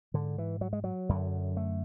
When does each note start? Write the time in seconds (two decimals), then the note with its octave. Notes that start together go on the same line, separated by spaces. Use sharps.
0.14 G#2 D3
0.38 E3
0.61 F#3
0.73 G#3
0.84 F#3
1.09 F#2 D3
1.57 A3